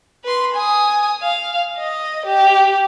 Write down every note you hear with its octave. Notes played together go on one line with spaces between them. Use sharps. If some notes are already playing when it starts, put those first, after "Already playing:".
B4 C6
G#5 D#6
F5
D#5
G4